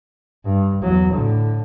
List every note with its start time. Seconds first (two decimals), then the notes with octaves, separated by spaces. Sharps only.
0.45 G2
0.82 E2 F#3
1.14 A2 D3